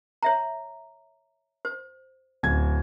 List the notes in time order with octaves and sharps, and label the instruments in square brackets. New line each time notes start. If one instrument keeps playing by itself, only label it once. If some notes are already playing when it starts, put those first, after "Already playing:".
[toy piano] C#5 E5 A#5
C5
[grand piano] D1 G#6